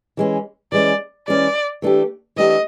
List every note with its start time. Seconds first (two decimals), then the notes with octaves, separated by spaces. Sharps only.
0.17 E3 G#3 C#4
0.72 E3 G#3 C#4 D5
1.28 E3 G#3 C#4 D5
1.82 E3 A3 D4 G4
2.36 E3 A3 D4 G4 D#5